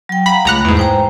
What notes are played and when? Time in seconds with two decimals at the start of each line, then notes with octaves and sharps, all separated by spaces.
0.09 F#3 G5
0.26 F5 F#5 A#5 B5
0.45 C#2 A3 A#5 B5 F#6
0.65 E2 G#2
0.77 C5 G5 A#5